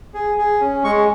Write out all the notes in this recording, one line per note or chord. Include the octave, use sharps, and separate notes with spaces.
G#4
G#4
C#4
G#3 C#6